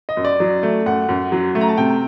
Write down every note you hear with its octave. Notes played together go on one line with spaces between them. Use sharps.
D#5
F#2
D5
F#3
A3
F#2 F#5
F#2
F#3
A3
A#5
A5
C3 G5